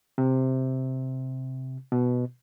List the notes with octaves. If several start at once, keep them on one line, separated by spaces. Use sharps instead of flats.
C3
B2